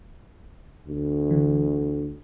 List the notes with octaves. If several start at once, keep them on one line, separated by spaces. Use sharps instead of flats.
D2
D3 E3